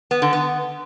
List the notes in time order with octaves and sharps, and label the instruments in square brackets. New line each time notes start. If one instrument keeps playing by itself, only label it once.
[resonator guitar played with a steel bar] B3
D3
B3